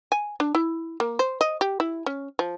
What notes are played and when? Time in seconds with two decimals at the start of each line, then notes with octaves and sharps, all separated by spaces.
0.12 G#5
0.40 D4
0.55 E4
1.00 A#3
1.19 C5
1.41 D#5
1.61 G4
1.80 E4
2.06 C#4
2.39 F3